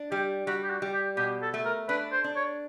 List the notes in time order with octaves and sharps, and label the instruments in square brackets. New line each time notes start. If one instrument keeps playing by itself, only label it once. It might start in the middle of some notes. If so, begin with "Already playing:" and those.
Already playing: [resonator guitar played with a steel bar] D4
[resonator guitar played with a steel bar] G3 [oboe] G4
[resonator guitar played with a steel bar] G3 [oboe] F#4
[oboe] G4
F#4
[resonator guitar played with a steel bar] G3
[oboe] G4
[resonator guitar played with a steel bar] B2 [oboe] G4
[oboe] A4
[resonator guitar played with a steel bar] A3
[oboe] A#4
[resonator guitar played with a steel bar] D4 [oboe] B4
[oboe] C5
[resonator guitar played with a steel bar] D4
[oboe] C#5